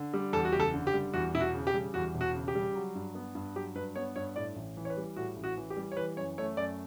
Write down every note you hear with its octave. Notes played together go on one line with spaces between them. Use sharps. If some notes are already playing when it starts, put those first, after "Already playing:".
Already playing: D3
G3
E2 A4
F#4
F#1 G4
A4
D3
G4
G3
E2 F#4
E1 E4
F#4
C#3
G4
G3
E2 F#4
E1
F#4
C#3
G4
G3
F#3
G2
B3
G2
F#3 G4
G2 B4
B3 C#5
G2 C#5
A2 D5
A1
E3
C#5
B4
G3
A2 F#4
A1
F#4
E3
G4
G3
C#5
E3 B4
F#2 C#5
A3 C#5
F#2 D5